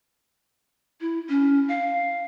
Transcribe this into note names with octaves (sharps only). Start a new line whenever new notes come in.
E4
C#4
F5